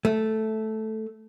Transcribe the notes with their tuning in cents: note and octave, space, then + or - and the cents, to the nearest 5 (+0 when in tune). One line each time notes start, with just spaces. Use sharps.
A3 -5